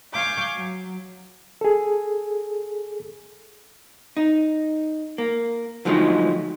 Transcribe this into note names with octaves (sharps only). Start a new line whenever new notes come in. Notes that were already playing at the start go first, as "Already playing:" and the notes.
F5 G#5 C#6 D6 G6
F#3
G#4 A4
D#4
A#3
D3 F3 F#3 G#3 A3 D#4